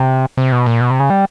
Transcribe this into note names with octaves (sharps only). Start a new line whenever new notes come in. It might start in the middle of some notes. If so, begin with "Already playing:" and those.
Already playing: C3
C3
B2
A#2
B2
C3
C#3
G3